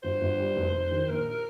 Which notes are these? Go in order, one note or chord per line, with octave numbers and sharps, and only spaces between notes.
G1 C5
G1
G3
F1
F1
D#3
A#1 A#4